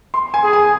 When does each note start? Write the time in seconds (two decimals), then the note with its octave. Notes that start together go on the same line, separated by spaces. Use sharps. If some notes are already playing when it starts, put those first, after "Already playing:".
0.14 C6
0.34 G#5
0.43 G#4
0.53 G#5